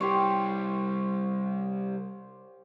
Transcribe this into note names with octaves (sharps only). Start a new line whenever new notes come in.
C3 G3 G4 C5 C#5